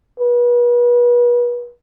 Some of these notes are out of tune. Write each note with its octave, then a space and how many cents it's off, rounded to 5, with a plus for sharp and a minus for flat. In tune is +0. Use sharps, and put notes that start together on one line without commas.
B4 -35